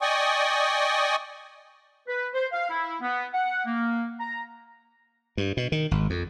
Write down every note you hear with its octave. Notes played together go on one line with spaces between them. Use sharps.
D5 D#5 G5 G#5 C#6 D#6
B4
C5
F5
E4
B3
F#5
A#3
A#5
G2
B2
D#3
G#1
F2